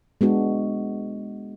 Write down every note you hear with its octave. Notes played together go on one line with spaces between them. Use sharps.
G#3 B3 D4 F#4